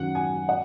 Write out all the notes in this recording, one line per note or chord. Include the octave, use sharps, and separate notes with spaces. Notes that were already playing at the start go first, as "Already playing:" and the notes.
Already playing: F#2 D#3 F#5
G#5
F#5